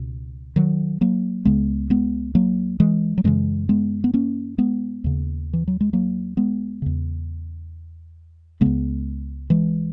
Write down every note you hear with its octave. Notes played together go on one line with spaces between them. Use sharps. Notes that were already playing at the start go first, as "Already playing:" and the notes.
Already playing: C#2 B2
D#3 F#3
F#3 A#3
C#2 C#3 G#3 B3
G#3 B3
F#3 A#3
E3 G#3
F#3
F#2 C#3 E3 G#3
G#3 B3
B3
A#3 C#4
G#3 B3
D#2 C#3
E3
F#3
G#3
F#3 A#3
G#3 B3
E2 C#3
C#2 C#3 G#3 B3
E3 G#3